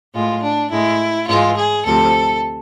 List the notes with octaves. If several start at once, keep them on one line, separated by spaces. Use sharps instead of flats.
A2 G#3 F4
D4
A2 G#3 E4
G#2 E3 G#3 F4
G#4
D2 C3 F3 A4